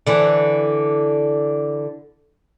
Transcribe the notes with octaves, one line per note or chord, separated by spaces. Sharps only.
D3 E3